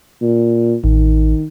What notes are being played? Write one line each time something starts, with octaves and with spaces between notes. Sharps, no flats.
A#2
A1 D#3